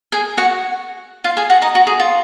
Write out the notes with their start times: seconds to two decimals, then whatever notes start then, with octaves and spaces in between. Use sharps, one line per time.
0.12 G#4 G#5
0.37 F#4 F#5
1.24 F4 F5
1.37 G#4 G#5
1.50 F#4 F#5
1.62 D#4 D#5
1.75 F#4
1.87 G#4
2.00 F4